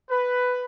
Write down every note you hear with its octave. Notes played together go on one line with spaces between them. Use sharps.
B4